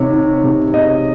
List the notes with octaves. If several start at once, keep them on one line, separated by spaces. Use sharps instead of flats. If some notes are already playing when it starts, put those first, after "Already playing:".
Already playing: C3 D#3 C#5
D#3
C3
C3 D#5